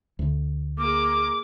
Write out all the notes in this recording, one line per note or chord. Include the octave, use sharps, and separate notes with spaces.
D2 D3
A#3 G#4 D6